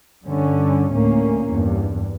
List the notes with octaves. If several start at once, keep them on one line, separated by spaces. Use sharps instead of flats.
G2 D3 C#4
D2 A2 A#3 C#4
E2 G2